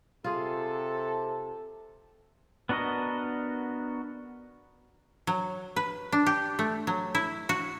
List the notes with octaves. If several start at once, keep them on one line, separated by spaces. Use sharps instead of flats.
C3 F4 G#4 A4
B3 D4 F#4 A#4 D#5
F#3
B4
D4
G4
A3
F#3
E4
F#4